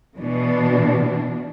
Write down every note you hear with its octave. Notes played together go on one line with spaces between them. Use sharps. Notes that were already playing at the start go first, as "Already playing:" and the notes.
B2 E3 D4